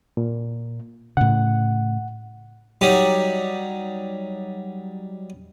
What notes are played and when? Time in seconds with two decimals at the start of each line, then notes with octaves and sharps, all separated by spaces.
0.17 A#2
1.17 A2 C#3 F#5
2.81 F#3 G3 D#4 G4